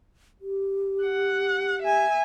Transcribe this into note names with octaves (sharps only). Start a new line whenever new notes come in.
G4
F#5
E5 G#5